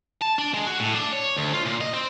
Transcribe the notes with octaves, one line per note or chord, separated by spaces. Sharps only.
A5
D4
G#3
F#4
A2
D4
C#5
D2
F4
A#2
D#5
C4